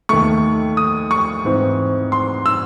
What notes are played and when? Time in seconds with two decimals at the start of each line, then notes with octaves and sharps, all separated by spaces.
0.09 D#2 D#3 A3 C#6
0.77 D#6
1.11 C#6
1.45 G#2 E3 C4
2.12 C6
2.46 E6